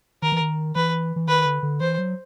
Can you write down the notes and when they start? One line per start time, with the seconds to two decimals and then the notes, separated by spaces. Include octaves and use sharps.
0.22 D#3 A#4
0.32 E3
0.41 D#3
0.75 E3 B4
1.16 E3
1.28 D#3 B4
1.46 D3
1.63 D3
1.80 E3 C5
1.98 F#3